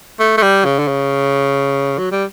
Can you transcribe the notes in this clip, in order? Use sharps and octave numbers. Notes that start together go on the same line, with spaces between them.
A3
A3
G3
C#3
D3
C#3
F#3
G3